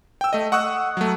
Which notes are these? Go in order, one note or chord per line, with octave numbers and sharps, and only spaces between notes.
G5 E6
A3 D#5
F#5 C#6 D#6 E6 F#6
F#3 A3